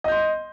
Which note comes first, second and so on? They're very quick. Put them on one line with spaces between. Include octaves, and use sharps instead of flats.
D#5 G6 C6